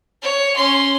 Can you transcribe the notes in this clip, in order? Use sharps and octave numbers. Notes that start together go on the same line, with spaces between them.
C#5
C#4 C6